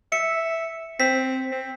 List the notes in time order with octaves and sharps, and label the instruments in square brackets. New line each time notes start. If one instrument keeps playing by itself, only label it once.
[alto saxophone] E5 [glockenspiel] C#7
[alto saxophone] C4 [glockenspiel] B6
[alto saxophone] C4